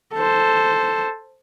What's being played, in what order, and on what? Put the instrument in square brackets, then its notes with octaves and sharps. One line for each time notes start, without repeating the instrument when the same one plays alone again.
[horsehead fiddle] A4 C5